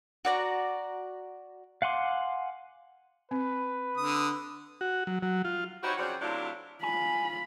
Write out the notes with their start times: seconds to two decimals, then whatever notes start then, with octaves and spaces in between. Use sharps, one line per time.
0.25 F#4 D5 A#5
1.82 F5 F#5 G#5 C6 D6
3.31 C4 B4
3.97 D3 D#6
4.81 F#4
5.07 F#3
5.23 F#3
5.45 F4
5.83 D#4 E4 F#4 G4 C5 C#5
5.98 C#3 F3 C4 F#4 C#5 D5
6.21 C3 F#3 A3 D4 E4 F4
6.83 F4 G#5 B5